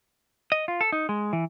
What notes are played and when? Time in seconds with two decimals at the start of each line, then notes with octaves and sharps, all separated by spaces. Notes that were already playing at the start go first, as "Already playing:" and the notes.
0.52 D#5
0.68 F4
0.81 A4
0.92 D#4
1.09 G#3
1.33 E3